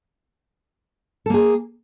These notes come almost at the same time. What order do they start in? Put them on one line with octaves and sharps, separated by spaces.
A4 A#3 G#4